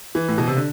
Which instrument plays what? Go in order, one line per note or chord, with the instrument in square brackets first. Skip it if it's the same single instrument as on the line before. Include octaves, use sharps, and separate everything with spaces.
[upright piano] E3
A2
B2
C3
D3